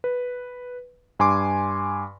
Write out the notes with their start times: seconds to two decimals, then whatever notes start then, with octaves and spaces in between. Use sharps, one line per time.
0.04 B4
1.19 G2 G#5 C6 D6